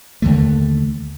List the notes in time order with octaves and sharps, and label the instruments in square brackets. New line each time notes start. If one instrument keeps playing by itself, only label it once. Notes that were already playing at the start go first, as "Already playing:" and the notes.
[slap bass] D#2 D3 A3